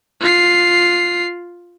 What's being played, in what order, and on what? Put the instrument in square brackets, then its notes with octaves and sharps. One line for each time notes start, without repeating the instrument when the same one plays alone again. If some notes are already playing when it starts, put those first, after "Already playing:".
[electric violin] F4 C7